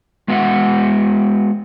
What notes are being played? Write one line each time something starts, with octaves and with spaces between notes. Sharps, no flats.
G#3 B3 F#4 E5 F#5